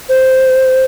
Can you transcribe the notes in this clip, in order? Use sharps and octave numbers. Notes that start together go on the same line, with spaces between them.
C5